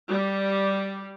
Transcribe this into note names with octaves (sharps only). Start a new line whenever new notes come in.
G3